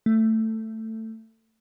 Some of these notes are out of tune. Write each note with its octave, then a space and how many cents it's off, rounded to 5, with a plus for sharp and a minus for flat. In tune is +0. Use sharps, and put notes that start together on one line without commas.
A3 +15